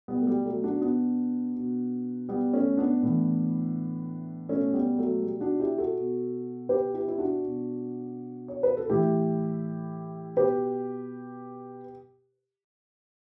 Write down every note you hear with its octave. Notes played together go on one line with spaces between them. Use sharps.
B2 G3 B3
A3
G3
F#3 A3
D4 F#4
B3 D4
B2
G3 B3
A3 C#4
B3 D4
A2 E3
B2 A3 C#4
G3 B3
F#3 A3
G3
D4 F#4
E4 G4
F#4 A4
B2
G4 B4
E4 G4
E4
D4 F#4
B2
C#5
B4
A4
A2 E3 E4 G4
B2 G4 B4